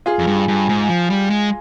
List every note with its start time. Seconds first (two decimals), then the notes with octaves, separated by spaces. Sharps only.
0.06 F4 G#4
0.19 F2
0.27 G2
0.48 G2
0.69 G#2
0.89 F3
1.10 G3
1.30 G#3